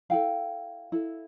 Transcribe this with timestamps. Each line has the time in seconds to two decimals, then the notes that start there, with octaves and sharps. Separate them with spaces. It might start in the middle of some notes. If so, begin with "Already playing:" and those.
0.10 E4 A4 F5 G5
0.92 E4 A4